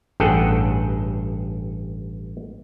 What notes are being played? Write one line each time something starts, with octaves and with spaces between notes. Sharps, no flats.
A1 G2 G#4 A4 F#5 G5